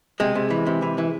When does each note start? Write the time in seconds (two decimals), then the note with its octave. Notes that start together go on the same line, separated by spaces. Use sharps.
0.20 C3 G#3
0.35 C3
0.50 E3
0.66 C3
0.82 E3
0.98 E3